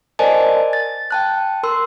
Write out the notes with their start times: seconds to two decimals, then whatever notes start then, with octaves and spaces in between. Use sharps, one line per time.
0.19 A#4 C5 D5 D#5 G#5 A5
0.73 A6
1.11 G5 A5 F#6
1.64 A#4 C6 E6